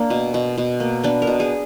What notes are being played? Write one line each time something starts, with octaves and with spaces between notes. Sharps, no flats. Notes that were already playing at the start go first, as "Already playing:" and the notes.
Already playing: A#3 D4
B2
B2
B2
A#3
B3 D4
A#4
B2
G#4